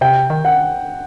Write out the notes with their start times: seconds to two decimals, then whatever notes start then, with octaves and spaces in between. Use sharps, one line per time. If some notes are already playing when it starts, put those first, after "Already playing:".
0.01 C3 G5
0.30 D#3
0.45 F#5